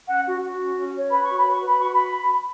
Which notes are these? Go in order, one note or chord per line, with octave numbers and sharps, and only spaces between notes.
C#4 F#5
F#4
F#4
C#4
C#4
C#5
B4 B5
F#4 C#6
B5
B4
C#6
B4 B5
F#4 C#6
B5